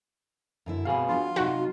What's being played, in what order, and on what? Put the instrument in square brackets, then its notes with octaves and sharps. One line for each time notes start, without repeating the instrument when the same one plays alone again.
[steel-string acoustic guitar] F#2 D3 E4
[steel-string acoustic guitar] B2 C4 [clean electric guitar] B3 G#4 F5
[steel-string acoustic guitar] F#3 G3 D4 [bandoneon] F4
[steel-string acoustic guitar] C3 C#4 [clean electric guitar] F#3 D#4 [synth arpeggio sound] F#4